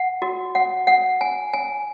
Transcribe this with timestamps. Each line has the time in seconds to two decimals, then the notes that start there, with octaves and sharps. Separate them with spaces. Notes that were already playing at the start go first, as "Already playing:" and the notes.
Already playing: F#5
0.22 F#4
0.55 F#5
0.87 F#5
1.21 G#5
1.53 G#5